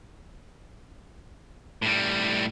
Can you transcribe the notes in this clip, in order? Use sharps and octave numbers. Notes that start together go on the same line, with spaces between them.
A2 G3